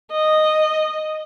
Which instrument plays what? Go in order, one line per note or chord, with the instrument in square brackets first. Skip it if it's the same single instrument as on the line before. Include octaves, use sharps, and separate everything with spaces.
[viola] D#5